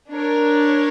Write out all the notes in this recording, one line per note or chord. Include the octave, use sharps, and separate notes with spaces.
D4 A#4 C#5